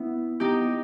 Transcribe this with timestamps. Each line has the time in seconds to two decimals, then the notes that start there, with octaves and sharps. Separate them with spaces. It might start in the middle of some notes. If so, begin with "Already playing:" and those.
Already playing: B3 E4
0.40 B3 D#4 G4